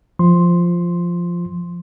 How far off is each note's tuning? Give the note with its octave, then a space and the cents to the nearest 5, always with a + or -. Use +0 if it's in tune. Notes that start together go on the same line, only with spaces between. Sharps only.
F3 -5 C6 +5